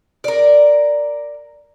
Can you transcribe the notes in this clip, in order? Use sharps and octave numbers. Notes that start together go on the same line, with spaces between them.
A#4 D5